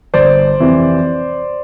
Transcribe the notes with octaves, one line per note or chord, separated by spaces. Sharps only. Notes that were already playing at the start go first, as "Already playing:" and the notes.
G1 C5 D5
F2 C3 E3